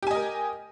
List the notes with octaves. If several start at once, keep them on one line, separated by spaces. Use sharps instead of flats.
G4 A#4 D#5 G#5